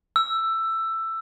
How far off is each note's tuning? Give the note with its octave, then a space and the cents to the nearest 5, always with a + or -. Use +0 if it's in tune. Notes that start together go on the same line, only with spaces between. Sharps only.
E6 +10